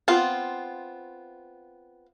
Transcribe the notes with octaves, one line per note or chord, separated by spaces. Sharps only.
B3 C4 F4